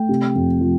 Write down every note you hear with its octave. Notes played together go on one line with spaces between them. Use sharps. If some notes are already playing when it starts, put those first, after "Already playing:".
Already playing: A3 G5
C3
F2
F3